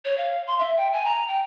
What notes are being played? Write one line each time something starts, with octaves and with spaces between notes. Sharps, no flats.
C#5
F5
C6
E5
G5
G#5
A#5
G5